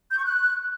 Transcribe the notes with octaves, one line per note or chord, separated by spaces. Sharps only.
G6
C#6
F#6